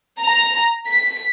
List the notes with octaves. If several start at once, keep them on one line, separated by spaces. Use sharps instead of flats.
A#5
B6